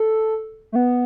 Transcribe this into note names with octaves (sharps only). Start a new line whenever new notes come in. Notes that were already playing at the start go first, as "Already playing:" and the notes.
Already playing: A4
A3
B3